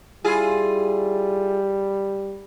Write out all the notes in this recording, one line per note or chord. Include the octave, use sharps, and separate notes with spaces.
G3 E4 F4 G#4